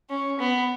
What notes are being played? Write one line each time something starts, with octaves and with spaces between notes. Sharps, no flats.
C#4
B3